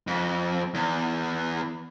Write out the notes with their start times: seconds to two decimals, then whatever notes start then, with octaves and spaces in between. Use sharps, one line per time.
0.07 F2
0.74 E2